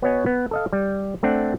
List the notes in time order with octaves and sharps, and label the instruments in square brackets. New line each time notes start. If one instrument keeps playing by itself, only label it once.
[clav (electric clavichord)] B3 F#4 C#5 D#5 G#5
B3
A4 D#5 F5
G3
A3 C4 D4 F#5